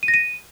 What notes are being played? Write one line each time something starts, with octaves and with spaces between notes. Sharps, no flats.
D#7
A#6
D#7